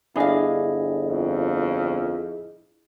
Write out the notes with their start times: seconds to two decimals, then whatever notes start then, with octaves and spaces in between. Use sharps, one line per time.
0.16 G1 D4 E4 G#4 D#5 F5
1.06 F2